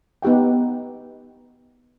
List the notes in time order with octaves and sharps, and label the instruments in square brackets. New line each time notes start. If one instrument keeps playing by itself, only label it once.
[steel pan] B3 D#4 G4 F#5 G5